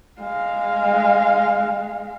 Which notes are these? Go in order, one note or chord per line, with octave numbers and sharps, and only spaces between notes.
G#3 F5